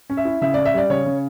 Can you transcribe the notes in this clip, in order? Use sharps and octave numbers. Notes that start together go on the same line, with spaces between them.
C#4
E5
E4
C#3 E5
C#4 D5
E5
G3 D5
C#3 C#5
C#3